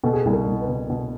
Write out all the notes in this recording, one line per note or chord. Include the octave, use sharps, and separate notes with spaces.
B2 A4
G#4
A4
C2
A#4
C2
B4
B2
B2